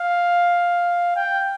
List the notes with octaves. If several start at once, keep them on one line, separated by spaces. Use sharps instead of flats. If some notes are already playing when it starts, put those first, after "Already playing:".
Already playing: F5
G5